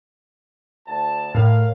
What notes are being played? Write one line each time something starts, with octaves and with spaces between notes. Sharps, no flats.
D2 A5
A2 A#4 C#5 F5